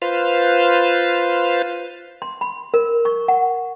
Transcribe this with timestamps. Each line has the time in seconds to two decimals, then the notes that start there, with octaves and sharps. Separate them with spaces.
0.02 F4 B4 C5 F5
2.22 C6
2.41 B5
2.74 A#4
3.05 C#6
3.28 F#5